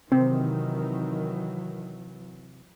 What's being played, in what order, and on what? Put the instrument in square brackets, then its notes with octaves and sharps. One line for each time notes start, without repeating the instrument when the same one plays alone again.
[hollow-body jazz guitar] C3 [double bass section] D#3 [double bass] E3 F#3 [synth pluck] C4